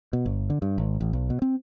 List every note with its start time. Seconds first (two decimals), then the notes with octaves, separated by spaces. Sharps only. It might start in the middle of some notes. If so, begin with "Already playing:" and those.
0.13 B2
0.26 G1
0.50 D3
0.62 G2
0.78 G#1
1.00 A1
1.13 B1
1.30 B2
1.42 C4